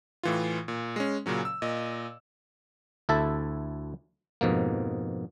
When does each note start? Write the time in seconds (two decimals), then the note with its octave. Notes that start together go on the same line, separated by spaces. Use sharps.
0.23 A2 E3 F4
0.68 A#2
0.96 G#3 C#4
1.26 A#2 C#3 F#3 C#4
1.45 E6
1.62 A#2 D#5
3.09 D2 E4 A4 E5 A5
4.41 F2 G#2 B2 A#3